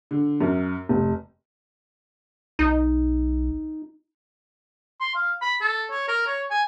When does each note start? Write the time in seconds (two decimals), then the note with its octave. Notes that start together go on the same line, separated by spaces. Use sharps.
0.11 D3
0.41 F#2
0.89 F1
2.59 B1 D#4
5.00 C6
5.15 F5
5.42 B5
5.61 A4
5.91 C#5
6.08 A#4
6.27 C#5
6.51 G#5